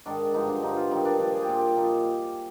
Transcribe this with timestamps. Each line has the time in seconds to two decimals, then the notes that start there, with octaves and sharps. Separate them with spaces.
0.06 G#2 D#3 D4
0.34 G2 D3 F3 D#4
0.48 D4
0.62 G2 D3 F3 D#4
0.77 F4
0.91 G2 D#3 D#4
1.05 D4
1.19 A#2 F3 D4
1.34 G#4
1.42 G4
1.48 A#2 F3 F4
1.58 G4
1.76 A#2 F3 D#4